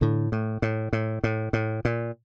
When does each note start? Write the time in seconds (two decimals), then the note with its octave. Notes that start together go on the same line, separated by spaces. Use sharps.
0.01 A2 D3
0.32 A2
0.62 A2
0.93 A2
1.24 A2
1.53 A2
1.85 A#2